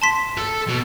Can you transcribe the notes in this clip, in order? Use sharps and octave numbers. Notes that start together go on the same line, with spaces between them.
A5 C6 B6
A4
B2